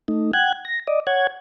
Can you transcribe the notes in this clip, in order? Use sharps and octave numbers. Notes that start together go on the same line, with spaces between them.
A3 D#4
F#5 G5 F#6 G#6
A#6
D5 D#5
C#5 F#5 G#6